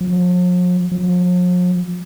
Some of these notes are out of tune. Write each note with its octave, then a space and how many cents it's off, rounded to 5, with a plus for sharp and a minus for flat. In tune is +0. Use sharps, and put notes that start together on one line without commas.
F3 +45
F3 +45